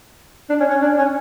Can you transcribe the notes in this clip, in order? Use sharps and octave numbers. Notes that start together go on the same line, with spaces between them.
D4
C#4
C#4
D4
C#4